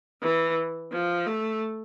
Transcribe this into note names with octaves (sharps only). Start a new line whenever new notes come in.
E3
F3
A3